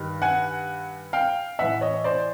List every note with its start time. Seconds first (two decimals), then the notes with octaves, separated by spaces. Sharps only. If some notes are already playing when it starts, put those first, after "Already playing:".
Already playing: G2 D#3
0.22 F#5 G#5
1.13 F5 G5
1.59 A2 E3 E5 F#5
1.81 C#5 D#5
2.04 C5 D5